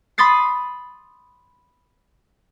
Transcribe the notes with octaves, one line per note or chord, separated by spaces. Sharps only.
B5 C6 D#6 A6 C7